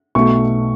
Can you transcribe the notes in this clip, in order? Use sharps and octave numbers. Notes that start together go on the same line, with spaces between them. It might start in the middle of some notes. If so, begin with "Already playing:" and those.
B1 B2 A3 C#6